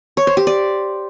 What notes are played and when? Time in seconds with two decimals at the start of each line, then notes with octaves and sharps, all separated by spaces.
0.17 C#5
0.27 C5
0.37 G4
0.47 D5